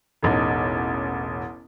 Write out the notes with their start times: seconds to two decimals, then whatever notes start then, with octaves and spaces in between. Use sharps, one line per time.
0.22 E1 A1 D#4